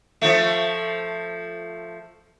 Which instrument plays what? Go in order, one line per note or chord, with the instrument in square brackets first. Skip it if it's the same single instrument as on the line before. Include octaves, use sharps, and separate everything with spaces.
[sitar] F3 A3